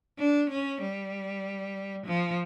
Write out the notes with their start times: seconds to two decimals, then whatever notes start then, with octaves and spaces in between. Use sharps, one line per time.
0.18 D4
0.50 C#4
0.82 G3
2.06 F3